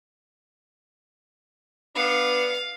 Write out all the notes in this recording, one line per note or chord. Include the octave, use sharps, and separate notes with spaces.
B3 D4 F5